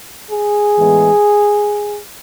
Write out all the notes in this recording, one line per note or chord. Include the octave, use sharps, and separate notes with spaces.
G#4
A2 E3 G#3 B3